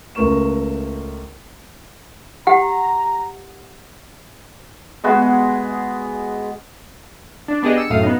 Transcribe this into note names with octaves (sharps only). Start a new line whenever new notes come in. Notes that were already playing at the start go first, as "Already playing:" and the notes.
C#2 A3 A#4 C#6 E7
G4 F#5 A#5
G#3 B3 F#4 G#4
D4
B3 D4 G4 G#4 D#5
E6 C#7
F#2 A2 A3 F5 D#6
B3 D#4